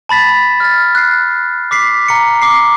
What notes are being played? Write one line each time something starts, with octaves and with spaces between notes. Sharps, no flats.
A5 B5 A6 B6
F6 A6
F#6 C7
D6 B6 C7
A#5 C#7
D6 C7